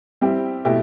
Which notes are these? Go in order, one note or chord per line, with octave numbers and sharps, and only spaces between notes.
G3 C4 E4 G4
B2 A3 E4 G4